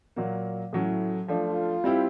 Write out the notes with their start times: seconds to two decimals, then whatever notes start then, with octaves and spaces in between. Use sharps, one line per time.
0.16 A#2 F#3 A#3
0.73 A2 F#3 A3 C#4 E4
1.28 F3 A3 D4 F4
1.84 G3 C4 E4 G4